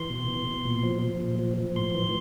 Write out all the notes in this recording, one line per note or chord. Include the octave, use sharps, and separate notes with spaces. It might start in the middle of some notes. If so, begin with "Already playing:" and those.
Already playing: E3 C6
B2
B2
B2
A#2
F3
F3
A#2
F3
F3
A2 C6
E3